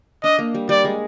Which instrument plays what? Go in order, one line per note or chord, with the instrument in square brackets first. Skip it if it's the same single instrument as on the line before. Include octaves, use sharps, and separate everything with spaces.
[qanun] D4 [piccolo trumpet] D#5
[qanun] A#3
G3
[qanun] G3 [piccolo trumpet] D5
[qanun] G#3